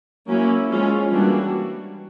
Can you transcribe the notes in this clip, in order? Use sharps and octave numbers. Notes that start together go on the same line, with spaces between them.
F#3 A#3 C#4 E4
F3 G#3 C#4 F4
E3 G3 A#3 D4 F#4